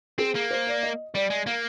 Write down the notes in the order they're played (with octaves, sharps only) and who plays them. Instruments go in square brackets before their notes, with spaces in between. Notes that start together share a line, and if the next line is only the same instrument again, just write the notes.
[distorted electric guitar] C4 [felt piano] G#4
[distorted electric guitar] A#3
[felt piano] C5
D5
D#5
[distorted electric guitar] G3 [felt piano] D5
[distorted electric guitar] G#3
[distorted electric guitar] A#3 [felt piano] F5